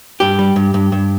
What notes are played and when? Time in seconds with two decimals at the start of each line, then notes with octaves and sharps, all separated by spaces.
0.20 G2 G4
0.39 G3
0.56 G2
0.74 G2
0.92 G2